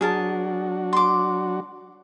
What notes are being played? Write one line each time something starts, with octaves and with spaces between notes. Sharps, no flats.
F#3 D4 F#4 G#4 A#4 A5
C6 D6